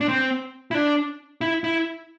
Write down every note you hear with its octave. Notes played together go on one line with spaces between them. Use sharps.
D4
C4
E4
D4
E4
E4